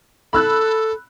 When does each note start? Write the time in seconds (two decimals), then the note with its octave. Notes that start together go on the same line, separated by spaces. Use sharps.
0.33 A4 B5 E6 F#6